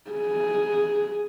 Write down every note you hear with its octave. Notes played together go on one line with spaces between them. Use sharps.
G#4